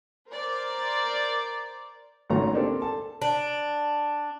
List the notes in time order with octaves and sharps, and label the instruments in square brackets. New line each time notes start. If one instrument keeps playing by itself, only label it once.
[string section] A#4 C5 D5
[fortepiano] G#1 C#2 A3 F#4 C#5 A#5
A#3 C4 D4 G4 A4 A#4
A4 A5
[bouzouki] D4